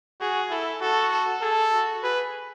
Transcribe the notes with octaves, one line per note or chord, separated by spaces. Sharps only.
F#4 G#4
E4 A4
F#4 A4
A4
G#4 A4
F#4
G#4 B4